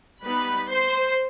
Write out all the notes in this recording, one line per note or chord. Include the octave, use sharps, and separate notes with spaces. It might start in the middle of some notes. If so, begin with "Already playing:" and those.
G3 B3 D#4 B4 B5
C5 C6